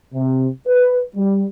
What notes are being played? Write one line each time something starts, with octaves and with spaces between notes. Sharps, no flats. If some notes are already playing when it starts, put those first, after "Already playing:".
C3
B4
G3